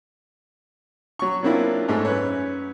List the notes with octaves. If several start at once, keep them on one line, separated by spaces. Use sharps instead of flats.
F#3 C#6
F#3 A#3 C4 D4 E4 F4
G#2 G#3 A3
F#2 B4 C#5